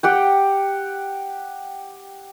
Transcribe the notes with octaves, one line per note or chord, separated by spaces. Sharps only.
G4 F#5 G5